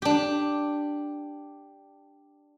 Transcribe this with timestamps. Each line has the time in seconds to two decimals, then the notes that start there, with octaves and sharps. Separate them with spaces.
0.02 D4 G4